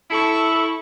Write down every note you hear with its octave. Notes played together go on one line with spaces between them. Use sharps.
E4 A4 C#6